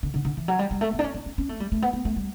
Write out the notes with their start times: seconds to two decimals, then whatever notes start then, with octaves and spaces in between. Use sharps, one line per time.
0.03 D3
0.14 D3
0.25 D3
0.37 E3
0.48 F#3
0.59 G3
0.71 G3
0.81 A3
0.93 B3
0.99 D4
1.04 C#4
1.15 D4
1.26 C#4
1.38 C#4
1.49 A3
1.60 G3
1.72 A3
1.82 B3
1.93 B3
2.05 A3
2.16 G3